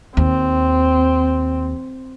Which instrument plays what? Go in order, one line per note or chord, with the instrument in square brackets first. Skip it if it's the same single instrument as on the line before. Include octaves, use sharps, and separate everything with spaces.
[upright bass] D#2 [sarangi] C4